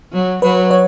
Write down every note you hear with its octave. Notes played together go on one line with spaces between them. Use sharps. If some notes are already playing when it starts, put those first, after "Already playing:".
F#3
F#3 B4
C#5